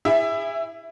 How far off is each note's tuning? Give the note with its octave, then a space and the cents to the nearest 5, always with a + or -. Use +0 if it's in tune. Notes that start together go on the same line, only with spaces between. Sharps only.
E4 +0 G#4 -35 E5 +15